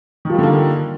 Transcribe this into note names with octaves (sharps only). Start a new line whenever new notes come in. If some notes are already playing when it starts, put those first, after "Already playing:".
D3 D#3 F3 G3 A#3